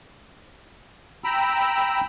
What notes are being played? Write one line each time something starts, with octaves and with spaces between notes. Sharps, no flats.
G5 A#5 B5 E6